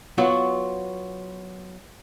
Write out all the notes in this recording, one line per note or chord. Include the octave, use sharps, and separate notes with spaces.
F#3 B3 F4 F#4